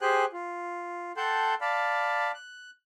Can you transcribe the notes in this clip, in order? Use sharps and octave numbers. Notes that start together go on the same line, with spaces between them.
G4 G#4 C5 G5 G#5 F#6
F4
A4 F#5 G5 A5 C6 G6
D5 F5 A5 B5
F#6